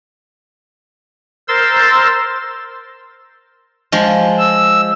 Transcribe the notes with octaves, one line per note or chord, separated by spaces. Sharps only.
A#4 C5 C6 E6 A6
F3 G#3
E6